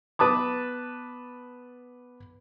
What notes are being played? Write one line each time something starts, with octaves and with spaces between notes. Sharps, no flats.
B3 B4 A5 D6 D#6